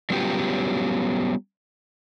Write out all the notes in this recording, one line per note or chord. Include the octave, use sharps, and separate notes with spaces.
F#3 G3 B3 C#4 F4 G4